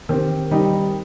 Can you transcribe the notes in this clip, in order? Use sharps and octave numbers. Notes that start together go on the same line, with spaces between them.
D#3 C4 G4
D#3 G3 C4 D#4 G4